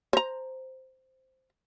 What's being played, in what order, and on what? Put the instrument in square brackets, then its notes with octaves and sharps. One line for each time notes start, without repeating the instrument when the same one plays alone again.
[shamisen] C5 A#5